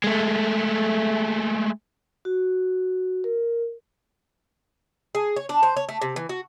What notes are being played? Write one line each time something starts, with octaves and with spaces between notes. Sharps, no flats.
G#3 A3
F#4
A#4
G#4
C#5
D4
C5
C#5
A3
C3
E3
F#4